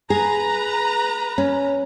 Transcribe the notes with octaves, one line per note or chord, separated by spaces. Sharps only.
G#4 B4 A#5
C#4